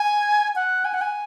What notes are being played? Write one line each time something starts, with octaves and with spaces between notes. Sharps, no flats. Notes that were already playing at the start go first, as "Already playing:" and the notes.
Already playing: G#5
F#5
G#5
F#5
G#5